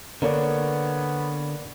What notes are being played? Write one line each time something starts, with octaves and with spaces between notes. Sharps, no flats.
D3 A#3 B3 D4 C#5